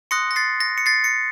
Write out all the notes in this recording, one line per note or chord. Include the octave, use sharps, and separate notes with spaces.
C6 D#6 F#6 A#6 C#7
A#6
A6 C7
A#6
C#7
A6 C7
A#6 C#7